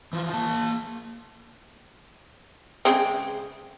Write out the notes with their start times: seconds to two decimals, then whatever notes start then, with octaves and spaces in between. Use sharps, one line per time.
0.13 E3 F3
0.33 A#3 A5
2.85 C#3 G#3 C4